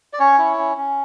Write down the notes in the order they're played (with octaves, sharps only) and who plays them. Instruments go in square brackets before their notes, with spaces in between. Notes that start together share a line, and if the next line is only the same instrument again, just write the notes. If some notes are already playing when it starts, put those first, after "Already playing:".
[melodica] D5
C#4 C#5
E4
C#4
C#4